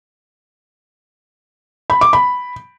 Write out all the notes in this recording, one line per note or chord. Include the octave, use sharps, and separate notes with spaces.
B5
D6
B5